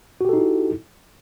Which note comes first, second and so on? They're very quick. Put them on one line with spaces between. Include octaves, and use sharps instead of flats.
F#4 G4 A4 D#4 E4